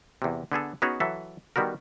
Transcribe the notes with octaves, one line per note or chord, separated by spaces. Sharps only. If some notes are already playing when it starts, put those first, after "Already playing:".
E2 C3
D3 B3 G#4 A4
B3 C#4 D#4 F#4 G#4 C#5
E3 F#3 A4 E5
D#3 G3 B3 F#4 A#4